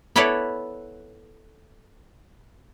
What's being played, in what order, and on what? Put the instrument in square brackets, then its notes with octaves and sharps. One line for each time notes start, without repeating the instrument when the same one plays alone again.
[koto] B3 E4 A4 B4 C#5 D5